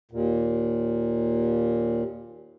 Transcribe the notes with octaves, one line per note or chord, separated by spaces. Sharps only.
D#2 A#2